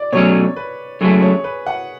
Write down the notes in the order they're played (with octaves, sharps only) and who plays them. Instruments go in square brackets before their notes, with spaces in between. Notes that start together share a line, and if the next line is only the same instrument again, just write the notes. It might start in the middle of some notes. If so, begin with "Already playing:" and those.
Already playing: [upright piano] D5
[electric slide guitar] B2 F#3 A3 C#4 [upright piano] C#5
[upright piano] B4
[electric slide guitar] F#2 C#3 F#3 A3 [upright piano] G#4
[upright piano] C#5
B4
F#5